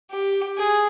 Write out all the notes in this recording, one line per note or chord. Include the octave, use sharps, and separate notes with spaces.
G4
G#4